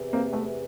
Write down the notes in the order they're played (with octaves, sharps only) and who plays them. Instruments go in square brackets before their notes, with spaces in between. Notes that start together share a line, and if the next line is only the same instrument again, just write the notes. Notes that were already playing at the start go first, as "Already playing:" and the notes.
Already playing: [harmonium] E2 C3 E3
[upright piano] A#3 C4
A3 B3